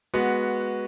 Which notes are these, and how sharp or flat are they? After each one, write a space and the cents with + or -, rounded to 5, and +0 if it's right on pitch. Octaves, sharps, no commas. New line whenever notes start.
G#3 +0 B3 -10 F#4 +0